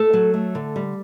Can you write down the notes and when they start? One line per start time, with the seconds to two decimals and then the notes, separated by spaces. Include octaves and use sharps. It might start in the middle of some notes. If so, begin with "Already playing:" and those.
Already playing: A3 A4
0.14 F#3
0.34 A3
0.55 D3
0.76 G3